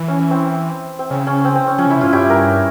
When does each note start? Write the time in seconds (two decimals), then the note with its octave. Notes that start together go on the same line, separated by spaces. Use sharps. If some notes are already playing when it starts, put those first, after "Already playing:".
Already playing: E3 E4
0.08 C#4
0.19 C#4
0.31 C4
0.99 C4
1.10 C#3 C#4
1.27 C#4
1.45 C4
1.55 C4
1.67 C#4
1.78 F3 C#4
1.87 C#3
1.90 E4
1.96 C3
2.01 G#2 C#4 F4
2.12 G2 E4 G4
2.29 G4 A#4